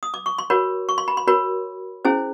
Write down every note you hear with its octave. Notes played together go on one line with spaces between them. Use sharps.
D#6
D6
C#6
C6
F#4 A#4 C#5 B5
C#6
C6
B5
C6
F#4 A#4 C#5 B5
C#4 E4 G#4 C5